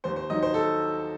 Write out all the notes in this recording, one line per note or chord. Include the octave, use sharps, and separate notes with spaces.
D#2 C5
C5
D#3 F#3 D#5
C5
A4